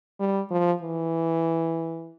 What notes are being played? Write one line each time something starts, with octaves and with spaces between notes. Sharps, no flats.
G3
F3
E3